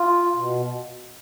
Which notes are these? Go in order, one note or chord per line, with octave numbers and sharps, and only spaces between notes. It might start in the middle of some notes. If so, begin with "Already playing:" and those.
Already playing: F4
B2